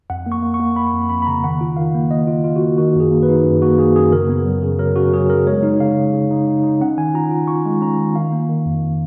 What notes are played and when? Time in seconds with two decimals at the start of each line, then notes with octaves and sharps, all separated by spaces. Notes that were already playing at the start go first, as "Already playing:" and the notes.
0.10 F2 F#5
0.26 A#3
0.32 C#6
0.42 A#3
0.54 C#6
0.60 A#3
0.76 A#3 B5
0.93 F2
1.09 F2 B5
1.22 B5
1.27 C#3 A#5
1.44 D#3 F#5
1.61 F4
1.77 D#3 F5
1.94 A#3
2.11 A#3 D#5
2.27 F4
2.44 F4
2.56 F#4
2.61 A#3
2.78 D#3 F#4
2.95 F#2
3.00 G#4
3.11 A#3
3.23 B4
3.29 D#4
3.45 F#2
3.62 A#3 F#4
3.78 A#3 G#4
3.96 F#2 G#4
4.12 C#3 A#4
4.29 B3
4.46 F#3
4.63 C#3
4.79 F#3 A#4
4.96 C#3 F#4
5.13 F#3 G#4
5.30 C#3 A#4
5.47 G#3 C#5
5.63 D#4
5.80 C#3 F5
5.97 C#3
6.13 C#3
6.31 D#4
6.48 D#4
6.64 D#4
6.81 C#4 F#5
6.97 D#3 G#5
7.14 F4 A#5
7.31 F4
7.47 F4 C#6
7.65 G#3
7.81 C#4 A#5
7.98 D#3
8.16 D#3 F5
8.32 A#3
8.49 D#3
8.66 F2